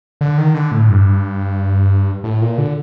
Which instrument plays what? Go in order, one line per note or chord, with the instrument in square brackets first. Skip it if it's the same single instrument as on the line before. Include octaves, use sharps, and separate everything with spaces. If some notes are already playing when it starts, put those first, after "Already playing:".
[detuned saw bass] D3
D#3
D3
A2
G2
A2
A#2
D3